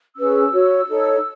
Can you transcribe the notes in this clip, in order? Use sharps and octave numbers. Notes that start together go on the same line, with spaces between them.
C#4 G#4 B4 E6
F#4 C#5
D#4 A4 C#5